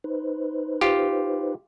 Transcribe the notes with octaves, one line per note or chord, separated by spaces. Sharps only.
D#4 B4 C5
F4 G4